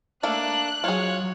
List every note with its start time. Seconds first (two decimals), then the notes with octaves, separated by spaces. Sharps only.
0.23 A3 A#3 D4 F#6
0.84 F#3 F4 G#4 C#5